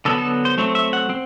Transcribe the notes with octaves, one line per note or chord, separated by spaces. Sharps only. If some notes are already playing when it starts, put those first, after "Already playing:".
D3 F#3 B3 A4
A4
C5
F#3 A3 C4
E5
F#5
C4